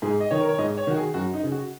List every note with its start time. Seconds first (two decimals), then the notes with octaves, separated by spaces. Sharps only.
0.02 G#2 G#4
0.20 D#5
0.31 D#3 C#5
0.41 A#4
0.49 C#5
0.58 G#2 D#5
0.77 C#5
0.87 D#3 F#4
0.96 G#4
1.14 F#2 F#4
1.33 D#4
1.43 C#3
1.52 F#4